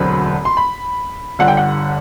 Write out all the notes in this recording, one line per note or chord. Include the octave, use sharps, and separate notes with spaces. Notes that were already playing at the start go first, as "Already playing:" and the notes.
Already playing: E1 D2 D3 F#3 C4 B5
C6
B5
G1 G2 D3 F#5
G5
F#5